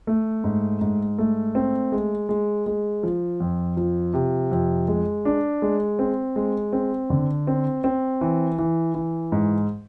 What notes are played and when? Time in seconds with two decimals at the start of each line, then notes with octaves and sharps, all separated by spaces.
0.07 A3
0.44 G#2
0.81 G#2
1.18 A3
1.55 C4
1.92 G#3
2.29 G#3
2.66 G#3
3.03 F3
3.40 F2
3.77 F3
4.14 C3
4.52 F2
4.88 G#3
5.25 D4
5.62 G#3
5.99 C4
6.36 G#3
6.73 C4
7.10 D3
7.47 C4
7.84 C4
8.21 E3
8.59 E3
8.95 E3
9.32 G#2